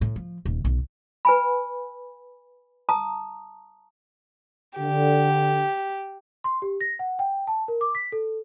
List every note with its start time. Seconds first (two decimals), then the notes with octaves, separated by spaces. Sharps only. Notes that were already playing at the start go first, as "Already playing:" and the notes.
0.01 A2
0.16 F3
0.45 D#1
0.64 B1
1.25 B4 G#5 B5
2.89 A5 A#5 D#6
4.79 D3 G4
6.44 C6
6.62 G4
6.81 A#6
6.99 F#5
7.19 G5
7.47 A5
7.68 A#4
7.81 D6
7.95 B6
8.12 A4